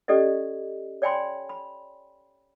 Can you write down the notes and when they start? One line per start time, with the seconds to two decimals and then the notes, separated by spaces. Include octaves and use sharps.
0.08 C#4 G4 A4 D5 D#5
1.02 C#5 D5 G5 G#5 B5 C6
1.49 B5